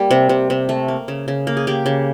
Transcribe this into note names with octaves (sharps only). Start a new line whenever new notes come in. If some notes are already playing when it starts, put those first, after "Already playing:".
Already playing: G3 A#3
C3
C3
C3
A3
A#3
C#3
C#3
A#3
G#4
A#3 G4
C#3